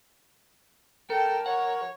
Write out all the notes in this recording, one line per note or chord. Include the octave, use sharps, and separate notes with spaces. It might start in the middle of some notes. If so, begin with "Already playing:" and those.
A4 A#4 G5 A5
C#5 F#5